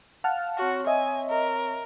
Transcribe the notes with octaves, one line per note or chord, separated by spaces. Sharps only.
F5 F#5 A5 F6
C4 F#4 C#5 C#6
D#5 E5 G#5
A#4